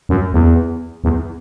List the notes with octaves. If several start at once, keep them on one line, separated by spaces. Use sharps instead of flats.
F#2
E2
E2